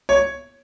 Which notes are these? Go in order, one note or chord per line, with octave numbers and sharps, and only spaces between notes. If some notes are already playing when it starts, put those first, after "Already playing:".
C#5